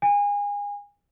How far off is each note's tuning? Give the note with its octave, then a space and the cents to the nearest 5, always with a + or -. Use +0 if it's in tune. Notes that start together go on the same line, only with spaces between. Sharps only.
G#5 -30